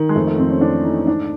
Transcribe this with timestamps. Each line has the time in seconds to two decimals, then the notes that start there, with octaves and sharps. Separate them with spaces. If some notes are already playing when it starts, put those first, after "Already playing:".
Already playing: D#3
0.09 G#3
0.15 F2 A3
0.27 A3
0.38 F2 C4
0.50 C#4
0.61 E3 D4
0.84 E3 D#4
1.07 G#2 D4